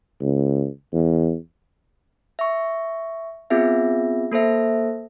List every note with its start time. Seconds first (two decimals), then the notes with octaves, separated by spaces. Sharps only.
0.20 C#2
0.93 E2
2.39 E5 C#6
3.50 B3 C4 F4 G#4 E5
4.32 A#3 A4 C5 E5